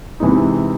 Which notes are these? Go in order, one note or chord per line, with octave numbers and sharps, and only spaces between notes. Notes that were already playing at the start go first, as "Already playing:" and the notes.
C3 E3 G#3 D#4